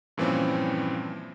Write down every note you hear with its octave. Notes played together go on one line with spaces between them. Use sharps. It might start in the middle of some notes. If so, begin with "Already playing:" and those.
G2 A#2 E3 F3 C4 C#4